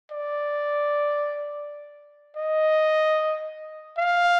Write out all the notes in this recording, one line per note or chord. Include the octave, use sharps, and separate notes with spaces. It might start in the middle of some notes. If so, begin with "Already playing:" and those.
D5
D#5
F5